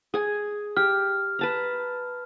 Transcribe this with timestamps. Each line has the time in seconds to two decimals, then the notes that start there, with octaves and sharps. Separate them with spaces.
0.14 G#4 G#5
0.77 G4 F6
1.39 B4 A5 A#5